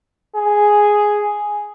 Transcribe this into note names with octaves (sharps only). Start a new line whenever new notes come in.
G#4